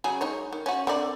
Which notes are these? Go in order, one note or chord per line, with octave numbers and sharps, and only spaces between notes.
C#3 F#3 G#4
G#3 D#4 C#5
D#3
C#4 F#4
D3 C4 D5